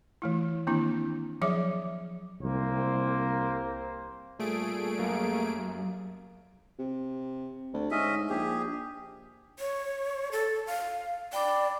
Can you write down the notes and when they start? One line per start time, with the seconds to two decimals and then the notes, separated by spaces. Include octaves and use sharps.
0.22 E3 A3 E4
0.67 D#3 A#3 C4 D4 E4
1.42 F3 F#3 G#4 C#5 E5 D6
2.41 C2 A#3 C4 C5
4.39 A#2 G3 A3 G#4 D7
4.99 F#2 A#3
6.79 C3
7.73 D2
7.91 G#2 C#4 D#5 E5
8.29 A#1 G4 G#4
9.59 C#5
10.32 A4
10.67 F5
11.33 D5 G5 B5 D6